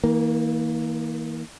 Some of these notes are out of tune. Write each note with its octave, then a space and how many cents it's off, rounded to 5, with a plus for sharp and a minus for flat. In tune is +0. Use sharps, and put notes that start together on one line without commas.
E3 -45 A#3 +0